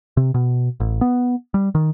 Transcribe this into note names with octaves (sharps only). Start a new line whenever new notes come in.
C3
B2
A1
B3
G3
D#3